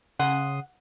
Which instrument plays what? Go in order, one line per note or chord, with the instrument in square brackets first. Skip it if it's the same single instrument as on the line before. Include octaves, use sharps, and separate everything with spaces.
[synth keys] C#3 C6 D#6 [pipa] F#5